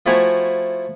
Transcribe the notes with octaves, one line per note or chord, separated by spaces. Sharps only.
F3 A3 E4 F#4 G#5 A#5